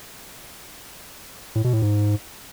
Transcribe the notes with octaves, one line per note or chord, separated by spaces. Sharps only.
A2
B2
A2
G#2